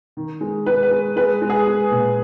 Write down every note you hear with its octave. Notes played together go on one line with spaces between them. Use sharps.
D#3
G#3
G#3 B4
B4
G#3
G#3 B4
G#3
G#4
G#3
A#2